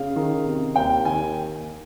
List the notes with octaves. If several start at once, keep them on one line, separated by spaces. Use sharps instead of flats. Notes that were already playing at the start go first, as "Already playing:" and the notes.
Already playing: C#3 F5
D#3
C3
D#2 G5
D#3 G#5